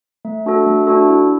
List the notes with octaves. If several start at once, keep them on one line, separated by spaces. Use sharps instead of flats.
A3
D4 F#4 A4
A3
D4 F#4 A4
E4